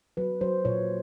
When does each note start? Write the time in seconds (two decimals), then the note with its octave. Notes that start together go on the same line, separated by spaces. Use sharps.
0.17 F#3 B4
0.41 F#3 C5
0.65 A#2 C#5